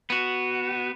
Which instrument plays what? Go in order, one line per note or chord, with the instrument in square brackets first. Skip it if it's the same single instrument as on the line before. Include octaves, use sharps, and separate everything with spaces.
[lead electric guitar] B3 F#4